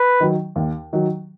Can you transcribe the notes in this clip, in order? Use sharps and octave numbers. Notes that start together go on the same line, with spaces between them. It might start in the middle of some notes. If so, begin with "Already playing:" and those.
Already playing: B4
D#3 F#3
D#2
D#3 F#3